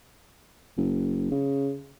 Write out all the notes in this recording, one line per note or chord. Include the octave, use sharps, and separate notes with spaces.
F#1
C#3